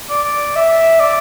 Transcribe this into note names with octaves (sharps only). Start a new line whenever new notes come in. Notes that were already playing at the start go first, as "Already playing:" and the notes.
D5
E5
D5